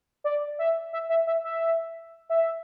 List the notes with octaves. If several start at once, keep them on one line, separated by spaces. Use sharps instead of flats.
D5
E5
E5
E5
E5
E5
E5